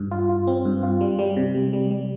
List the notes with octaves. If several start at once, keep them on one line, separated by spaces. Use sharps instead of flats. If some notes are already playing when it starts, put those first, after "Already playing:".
Already playing: G2
F4
F4
C4
G2
F4
G3
G3
C3
G3
G3
G3